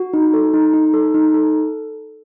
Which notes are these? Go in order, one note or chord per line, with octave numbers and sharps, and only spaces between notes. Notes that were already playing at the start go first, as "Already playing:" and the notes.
Already playing: F#4
D#4
A4
D#4
D#4
A4
D#4
A4